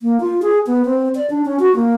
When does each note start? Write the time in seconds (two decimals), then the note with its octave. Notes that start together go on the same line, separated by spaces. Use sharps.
0.01 A#3
0.20 F4
0.43 G#4
0.67 B3
0.85 C4
1.15 D5
1.30 D4
1.45 C#4
1.60 F#4
1.75 A#3